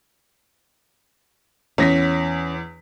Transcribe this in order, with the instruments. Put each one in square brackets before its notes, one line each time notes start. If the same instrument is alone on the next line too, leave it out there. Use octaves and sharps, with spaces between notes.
[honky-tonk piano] E2 A#6 B6 [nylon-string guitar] C#4